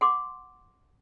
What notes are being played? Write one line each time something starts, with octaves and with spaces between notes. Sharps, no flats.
F#5 C6 D6